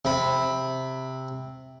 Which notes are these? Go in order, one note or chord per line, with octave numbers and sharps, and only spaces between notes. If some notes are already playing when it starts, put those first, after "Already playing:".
C3 B5